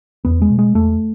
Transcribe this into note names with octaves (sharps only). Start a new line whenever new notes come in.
E2 B3
G#3
B2
G#3
E2 A3